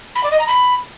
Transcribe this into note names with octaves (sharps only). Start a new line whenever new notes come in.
B5
D5
D#5
A#5
B5